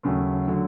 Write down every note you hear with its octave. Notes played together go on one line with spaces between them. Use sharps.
D#2 C#3 F#3 A3
D3 F#3